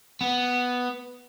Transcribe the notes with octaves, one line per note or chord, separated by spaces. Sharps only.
B3